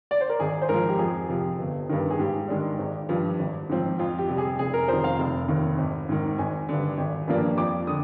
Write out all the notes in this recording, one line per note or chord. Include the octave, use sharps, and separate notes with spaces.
D5
C5
A#4
G#1 G#4
C5
G#2 F3 A#4
G4
F2 G#4
C3 F3
G1
G2 D#3
G#4
G#2 G4
D#3 G#3 D4
G#1
G2 F3
G#1
G#2 F3 C4
F2 F4
G4
C3 G3
G#4
F1 G#4
A#4
F2 D#3 C5
F5
F1
D#2 D#3
G#1
G#2 D#3
G#1 G#5
G2 D3
G#1
G2 F3 A#3 D4
F2 D6
D3 D#6